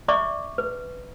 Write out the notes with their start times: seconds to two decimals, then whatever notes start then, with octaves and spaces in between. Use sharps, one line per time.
0.08 D5 E5 C#6 D6
0.58 B4